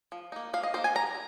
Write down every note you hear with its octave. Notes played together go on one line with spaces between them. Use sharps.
F3
A#3 D#4
F3 F5
D#5
A#3 D#4 C5
G#5
G3 A#5